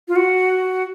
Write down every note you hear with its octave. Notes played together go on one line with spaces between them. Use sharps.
F4
F#4